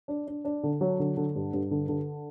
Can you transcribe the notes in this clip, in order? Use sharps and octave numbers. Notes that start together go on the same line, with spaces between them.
D4
D4
D4
D3
F#3
D3
D3
G2
G2
D3
D3